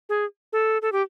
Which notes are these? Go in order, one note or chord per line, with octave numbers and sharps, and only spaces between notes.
G#4
A4
A4
G4